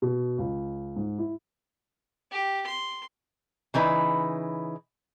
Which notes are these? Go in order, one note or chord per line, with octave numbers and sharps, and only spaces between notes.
B2
C#2
G#2
E4
G4
C6
C#3 E3 D#4 B4